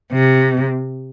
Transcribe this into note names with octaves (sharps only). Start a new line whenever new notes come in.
C3